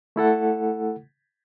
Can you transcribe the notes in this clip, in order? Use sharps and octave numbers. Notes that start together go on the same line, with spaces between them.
A3 E4 A4 F#5